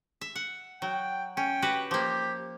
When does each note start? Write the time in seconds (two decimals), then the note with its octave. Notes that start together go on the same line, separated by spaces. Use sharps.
0.21 E5
0.35 F#5
0.82 F#3 G5
1.37 C#4 G5
1.62 F#4 G4 B4
1.91 F3 A#3 G4